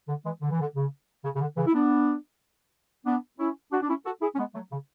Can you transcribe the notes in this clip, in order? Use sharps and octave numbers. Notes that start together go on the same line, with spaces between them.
D3
E3 G#3
D3
E3
D3
C#3
C#3
C#3
D3
C#3 E3
E4
B3 D4
B3 D4
C#4 E4
D4 F#4
D4
C#4 E4
F#4 A4
E4 G#4
C#4
G#3 B3
F#3 A3
C#3